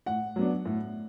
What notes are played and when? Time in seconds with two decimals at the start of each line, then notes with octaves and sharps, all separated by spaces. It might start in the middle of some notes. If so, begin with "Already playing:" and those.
0.06 A2 F#5
0.36 F#3 B3 D4
0.65 A2